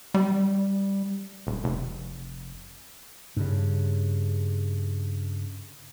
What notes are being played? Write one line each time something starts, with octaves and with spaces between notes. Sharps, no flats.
G3
D#1
F1
G2 C#3